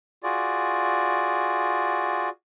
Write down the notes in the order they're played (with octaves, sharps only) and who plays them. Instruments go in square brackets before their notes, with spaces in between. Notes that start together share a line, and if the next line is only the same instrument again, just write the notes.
[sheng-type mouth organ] F4 F#4 G#4 D5